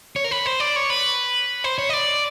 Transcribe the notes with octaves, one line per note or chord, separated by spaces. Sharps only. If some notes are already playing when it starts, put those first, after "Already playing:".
C#5
A#4
B4
C5
D5
C#5
B4
C5
C#5
D#5
D5